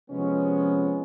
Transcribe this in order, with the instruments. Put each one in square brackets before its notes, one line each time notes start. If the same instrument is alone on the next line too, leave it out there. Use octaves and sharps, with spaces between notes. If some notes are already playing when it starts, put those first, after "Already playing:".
[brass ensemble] C3 F3 G#3 B3 C#4